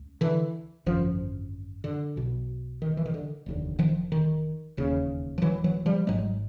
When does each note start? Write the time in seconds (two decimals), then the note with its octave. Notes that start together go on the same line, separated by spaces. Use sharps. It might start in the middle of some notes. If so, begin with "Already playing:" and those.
Already playing: C#2
0.21 D3 E3
0.86 G#1 F#2 D3 F3
1.84 D3
2.16 B1 B2
2.82 D#3
2.97 E3
3.06 D#3
3.14 D3
3.46 F1 D#2 D3
3.79 D#3 F3
4.12 D#3
4.77 E1 D#2 C#3
5.38 F3
5.42 E3 F#3
5.64 E3 F#3
5.86 F3 G3
6.07 G#1 G#2 F#3 G#3